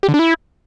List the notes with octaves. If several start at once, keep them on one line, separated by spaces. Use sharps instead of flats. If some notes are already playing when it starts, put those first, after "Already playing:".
G4
D3
D4
E4